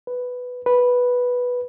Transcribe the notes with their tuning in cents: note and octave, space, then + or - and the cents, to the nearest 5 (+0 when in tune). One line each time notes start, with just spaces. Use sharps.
B4 +5
B4 -5